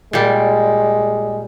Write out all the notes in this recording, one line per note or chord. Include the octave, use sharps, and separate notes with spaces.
A#2 G3 G#3